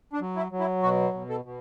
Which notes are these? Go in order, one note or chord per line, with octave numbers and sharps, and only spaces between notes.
D4
F#3
E4
F#3
E4
B2 F#4
B2
A4
B2